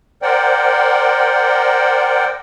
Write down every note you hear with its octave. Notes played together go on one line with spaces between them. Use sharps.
A#4 C5 D5 F#5 G5